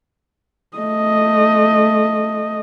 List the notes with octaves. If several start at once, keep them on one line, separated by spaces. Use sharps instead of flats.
A3 D#5